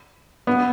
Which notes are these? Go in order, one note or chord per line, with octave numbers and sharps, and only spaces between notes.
B3